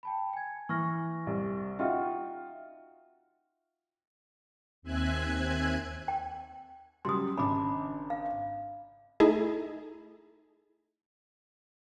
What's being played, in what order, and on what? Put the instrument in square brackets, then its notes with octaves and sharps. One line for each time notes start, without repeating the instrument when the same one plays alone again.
[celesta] G5 A5 B5
G#5 G#6
[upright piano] E3 [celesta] C#6 F6 A#6
[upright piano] C2
[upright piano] D#4 F4 F#4 [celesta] E5 G5 F6
[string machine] D#2 C4 E5 G#5 F#6 G#6
[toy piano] G5
[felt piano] C#3 F#3 G3 [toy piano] C6 D#6
[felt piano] G#1 C#3 D4 [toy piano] B5 D6
[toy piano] F5
[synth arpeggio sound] A3 D#4 E4 G#4